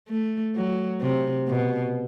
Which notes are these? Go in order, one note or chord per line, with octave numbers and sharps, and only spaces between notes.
A3
F#3
C3
B2